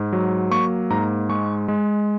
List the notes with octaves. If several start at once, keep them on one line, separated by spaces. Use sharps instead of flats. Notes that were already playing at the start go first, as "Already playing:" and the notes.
Already playing: G#2
F#3
A#3 C#6
G#2 A#5
G#3 C#6
G#3